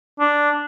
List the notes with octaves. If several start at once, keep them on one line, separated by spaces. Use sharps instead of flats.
D4